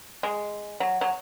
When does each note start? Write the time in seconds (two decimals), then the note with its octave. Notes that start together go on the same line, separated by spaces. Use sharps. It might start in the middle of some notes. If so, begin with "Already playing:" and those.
0.23 G#3
0.80 F#3
1.01 F#3